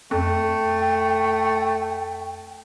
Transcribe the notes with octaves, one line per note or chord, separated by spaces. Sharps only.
F2 A3 G5